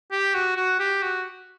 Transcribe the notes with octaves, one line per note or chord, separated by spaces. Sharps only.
G4
F#4
F#4
G4
F#4